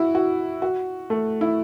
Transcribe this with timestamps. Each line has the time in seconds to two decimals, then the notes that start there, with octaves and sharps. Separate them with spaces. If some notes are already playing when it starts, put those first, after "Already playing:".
Already playing: E4 F#4
0.15 F#4
0.62 F#4
1.10 A3
1.41 E4